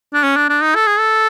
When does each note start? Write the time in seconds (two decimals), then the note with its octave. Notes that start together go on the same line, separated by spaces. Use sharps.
0.14 D4
0.24 C#4
0.37 D4
0.50 D4
0.62 D#4
0.75 A4
0.87 G#4
0.99 A4